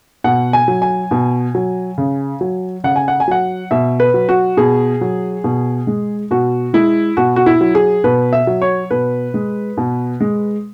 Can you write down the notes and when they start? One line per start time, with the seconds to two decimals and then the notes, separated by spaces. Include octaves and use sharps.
0.24 B2 F#5
0.53 G#5
0.68 F#3
0.82 G#5
1.11 B2
1.55 F#3
1.98 C#3
2.41 F#3
2.84 C#3 F#5
2.96 G#5
3.08 F#5
3.20 G#5
3.28 F#3 F#5
3.71 B2 E5
4.00 B4
4.14 F#3
4.29 F#4
4.57 B2 G#4
5.01 F#3
5.44 B2
5.87 G#3
6.31 B2 F#4
6.74 G#3 E4
7.17 B2 F#4
7.36 F#4
7.46 E4
7.61 F#3
7.75 G#4
8.04 B2 B4
8.33 E5
8.47 F#3
8.62 C#5
8.91 B2 B4
9.34 G#3
9.77 B2
10.21 G#3